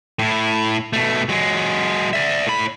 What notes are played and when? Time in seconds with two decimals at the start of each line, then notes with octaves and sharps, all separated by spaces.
0.19 A2 E4
0.93 B2 A3
1.29 F#3 G#3
2.13 D5 E5
2.47 A2 B5